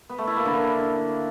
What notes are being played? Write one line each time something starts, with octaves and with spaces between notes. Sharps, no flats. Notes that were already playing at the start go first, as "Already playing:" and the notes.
B3
A3
E4
A#3
D3